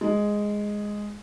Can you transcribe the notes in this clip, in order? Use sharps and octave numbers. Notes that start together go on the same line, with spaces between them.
G#3